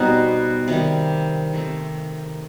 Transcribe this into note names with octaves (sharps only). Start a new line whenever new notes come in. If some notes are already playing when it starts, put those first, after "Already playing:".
Already playing: B2 G3 C4 D#4 F#4
C3 D#3 G3
D#3 A3 C4